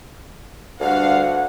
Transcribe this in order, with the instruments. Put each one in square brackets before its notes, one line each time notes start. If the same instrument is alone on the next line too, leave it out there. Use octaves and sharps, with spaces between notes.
[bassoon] D2 [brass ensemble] G2 D3 F5 [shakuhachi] F#5